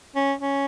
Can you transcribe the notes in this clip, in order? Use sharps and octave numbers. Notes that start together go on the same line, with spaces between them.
C#4
C#4